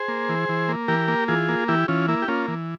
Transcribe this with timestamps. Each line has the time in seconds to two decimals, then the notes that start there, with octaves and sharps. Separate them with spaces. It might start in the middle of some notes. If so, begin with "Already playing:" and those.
Already playing: G#4 C5
0.08 A#3
0.29 E3
0.49 E3
0.69 A#3
0.88 E3 G4 A#4
1.08 A#3
1.28 E3 F4 G#4
1.49 A#3
1.68 E3 E4 G4
1.88 E3 C#4 F4
2.08 A#3 E4
2.22 G4
2.28 A#3 C#4 F4
2.48 E3